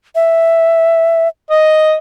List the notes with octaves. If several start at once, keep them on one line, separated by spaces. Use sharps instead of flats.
E5
D#5